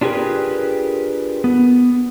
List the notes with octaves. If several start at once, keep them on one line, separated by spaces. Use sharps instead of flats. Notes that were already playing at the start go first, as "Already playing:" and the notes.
D4 F4 G4 G#4 A#4 B4
B3